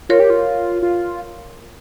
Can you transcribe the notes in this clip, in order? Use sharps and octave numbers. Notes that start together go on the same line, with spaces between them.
F4 A#4 C#5
G4
F4
F4